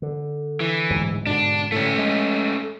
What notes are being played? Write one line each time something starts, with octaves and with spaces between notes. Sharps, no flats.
D3
E3
D1 D2 G#2
G#2 B2 D3 D4
A2 D3 A3 C#4
G#3